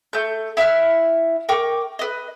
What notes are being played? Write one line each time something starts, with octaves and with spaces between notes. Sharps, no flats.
A3 G6
E4 E5 F#5 F6
A#4 G5 C#6 D6
B4 D#5